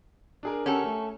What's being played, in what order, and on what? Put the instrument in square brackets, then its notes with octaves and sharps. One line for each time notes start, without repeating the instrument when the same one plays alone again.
[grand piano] D4 G#4 A#4
[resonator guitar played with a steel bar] C#4 A4 [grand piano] G4 A#4 F#5
[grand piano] A3